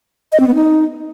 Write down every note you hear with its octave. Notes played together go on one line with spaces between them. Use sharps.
D#5
C4
B3
D#4